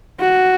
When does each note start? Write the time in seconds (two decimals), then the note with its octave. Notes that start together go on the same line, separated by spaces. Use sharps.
0.21 F#4